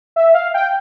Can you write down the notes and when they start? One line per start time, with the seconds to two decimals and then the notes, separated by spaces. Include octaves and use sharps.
0.16 E5
0.34 F5
0.54 G5